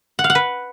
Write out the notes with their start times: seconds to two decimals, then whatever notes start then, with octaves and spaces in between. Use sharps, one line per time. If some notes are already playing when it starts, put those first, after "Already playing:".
0.19 F#5
0.24 F5
0.30 F#5
0.35 B4